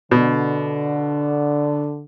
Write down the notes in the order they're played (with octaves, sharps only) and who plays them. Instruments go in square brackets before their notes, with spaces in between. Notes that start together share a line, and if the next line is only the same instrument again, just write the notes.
[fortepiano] B2 [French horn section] D3